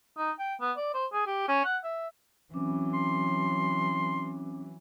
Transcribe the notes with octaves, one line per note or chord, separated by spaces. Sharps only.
D#4
G5
B3
D5
C5
G#4
G4
C#4
F#5
E5
E3 F#3 C4 C#4 D6
C6